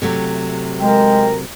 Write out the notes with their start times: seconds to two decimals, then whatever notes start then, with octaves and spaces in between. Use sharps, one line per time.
0.02 C3 F#3 A3
0.80 G#3 A#4 G5